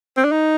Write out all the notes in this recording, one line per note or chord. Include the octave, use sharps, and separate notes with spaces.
C4
D4
D#4